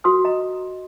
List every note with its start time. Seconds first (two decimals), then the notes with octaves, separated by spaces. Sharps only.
0.04 F#4 A#4 C6 D#6 E6
0.25 D#5 A#5